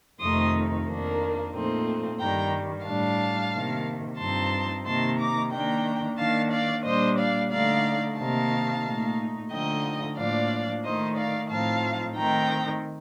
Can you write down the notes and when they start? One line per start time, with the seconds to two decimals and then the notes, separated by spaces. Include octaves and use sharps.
0.21 F2 C3 D#3 A3 D#4 C6 D#6
0.86 F2 D#3 A#3 D4
1.53 A#2 F3 A3 C4 D#4
2.20 G2 D#3 G3 G5 A#5
2.86 A2 G3 D4 F5 A5
3.52 C3 D#3 A#3
4.19 G2 F3 C4 D#4 A5 C6
4.85 C3 D#3 A#3 D#4 A5 C6
5.19 A#5 D6
5.52 D#3 A#3 D4 G5 A#5
6.19 D#3 A#3 D4 F5 A5
6.52 D5 F5
6.85 A#2 G3 D4 C5 D#5
7.18 D5 F5
7.51 D3 A3 D#4 D5 F5
8.18 C3 D#3 A#3 D#4 F5 A5
8.84 A#2 A3 D#4
9.51 D3 F3 A3 D#4 D#5 G5
10.17 A2 F3 A#3 D4 D5 F5
10.84 D#3 A3 D#4 C5 D#5
11.17 D5 F5
11.50 A2 F3 C4 D#4 F5 A5
12.16 D#3 A3 C4 D#4 G5 A#5